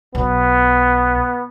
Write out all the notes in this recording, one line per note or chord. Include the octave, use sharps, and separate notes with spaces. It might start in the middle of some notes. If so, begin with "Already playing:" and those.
B1 B3